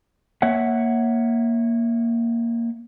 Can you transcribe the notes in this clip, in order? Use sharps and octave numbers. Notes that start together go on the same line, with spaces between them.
A#3 C#5 E5 F#5